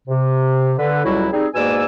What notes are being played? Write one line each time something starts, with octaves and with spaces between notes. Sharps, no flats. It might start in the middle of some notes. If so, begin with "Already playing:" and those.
C3
D3 B4
C#2 A2 F#3 G3 E4 F#4
G3 C4 D#4 G#4
G#2 B2 A#3 D5 G#5 E6